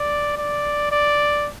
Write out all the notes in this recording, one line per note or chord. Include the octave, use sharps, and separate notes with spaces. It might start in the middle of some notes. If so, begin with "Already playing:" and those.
Already playing: D5
D5
D5